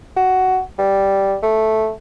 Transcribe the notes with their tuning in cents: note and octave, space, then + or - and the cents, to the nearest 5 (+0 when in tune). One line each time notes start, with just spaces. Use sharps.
F#4 +10
G3 -5
A3 -5